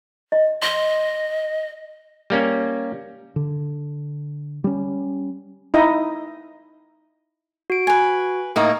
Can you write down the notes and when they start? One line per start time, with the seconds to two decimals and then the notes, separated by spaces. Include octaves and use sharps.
0.32 D#5
0.62 D#5 C6
2.30 G3 A#3 C#4
3.36 D3
4.64 G3 C#4
5.74 D#4 E4 D#5
7.70 F#4 D7
7.87 B4 G#5
8.56 A2 A#3 D#4